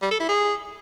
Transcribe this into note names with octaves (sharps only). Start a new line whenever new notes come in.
G3
A4
E4
G#4